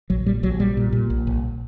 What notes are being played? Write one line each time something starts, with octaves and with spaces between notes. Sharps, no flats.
A#1 F#3
A#2 G3
A#1 F#3
A#2 G3
A#2
A#2
A#1
A#1